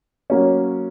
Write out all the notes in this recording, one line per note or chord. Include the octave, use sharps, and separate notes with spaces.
F#3 A#3 C#4